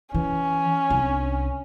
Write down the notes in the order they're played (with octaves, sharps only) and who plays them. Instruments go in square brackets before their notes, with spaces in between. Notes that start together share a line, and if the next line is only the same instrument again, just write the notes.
[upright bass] E3 [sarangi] C#4
[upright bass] C2 D4